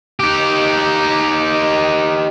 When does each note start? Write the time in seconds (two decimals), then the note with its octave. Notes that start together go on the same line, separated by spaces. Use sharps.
0.20 D#4 G4